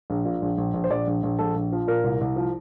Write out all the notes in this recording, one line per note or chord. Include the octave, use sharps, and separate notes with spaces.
A#1
A#2
A#1
A#1
A#1
C5
A#1 D5
A#1
A#1
A#1 A4
A#1
F3
A#2 A#4
C2
C2
F3